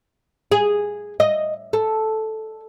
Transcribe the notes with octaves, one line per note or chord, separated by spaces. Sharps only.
G#4
D#5
A4